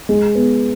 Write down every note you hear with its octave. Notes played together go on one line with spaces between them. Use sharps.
G#3
B3